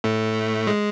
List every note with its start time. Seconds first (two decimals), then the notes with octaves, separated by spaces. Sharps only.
0.04 A2 A3
0.67 G#3